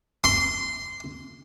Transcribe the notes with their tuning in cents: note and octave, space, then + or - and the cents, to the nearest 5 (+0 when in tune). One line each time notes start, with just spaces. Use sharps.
C6 -15